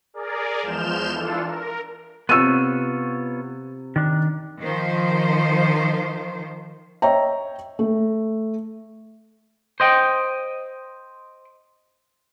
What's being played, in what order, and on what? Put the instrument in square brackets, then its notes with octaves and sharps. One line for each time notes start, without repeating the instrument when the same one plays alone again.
[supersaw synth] G#4 A#4 D5
E2 F3 G#3 F6 G6 E7
E3 D4 F4 A4
A#4
[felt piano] C3 E6 D#7 [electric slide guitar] B3 F4 C#5
[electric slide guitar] D#3 D4
[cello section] D#3 F3 C5
[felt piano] C#5 D#5 E5 G5 A#5
A3
[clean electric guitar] C5 D#5 G5